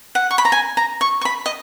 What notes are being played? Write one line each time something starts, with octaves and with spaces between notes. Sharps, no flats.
F#5
C#6
B5
A#5
G#5
A#5
C#6
C#6
B5
D#5